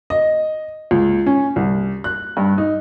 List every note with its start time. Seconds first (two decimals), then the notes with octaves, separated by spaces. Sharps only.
0.10 D#5
0.91 C#2
1.26 C#4
1.56 C2
2.04 F#6
2.37 G2
2.58 D#4